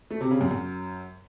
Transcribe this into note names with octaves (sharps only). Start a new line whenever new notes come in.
A3
C3
C#3
F#2
F#2